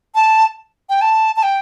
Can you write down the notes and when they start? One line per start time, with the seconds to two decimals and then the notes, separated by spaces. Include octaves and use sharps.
0.15 A5
0.89 G5
1.01 A5
1.36 A5
1.43 G5